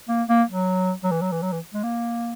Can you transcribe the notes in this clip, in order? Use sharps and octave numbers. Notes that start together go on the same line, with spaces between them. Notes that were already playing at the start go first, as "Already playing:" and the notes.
A#3
A#3
F#3
F#3
E3
F#3
E3
F#3
E3
G#3
A#3